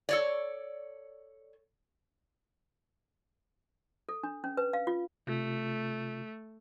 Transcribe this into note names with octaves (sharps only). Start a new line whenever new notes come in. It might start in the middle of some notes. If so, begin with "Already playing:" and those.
A4 C#5 D5
A4
D4
C#4
B4
F5
F4
C3 A3 F4